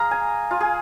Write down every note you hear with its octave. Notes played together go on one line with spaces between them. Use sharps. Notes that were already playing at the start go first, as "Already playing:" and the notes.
Already playing: G#4 F5 A#5
G#5
F4
G#4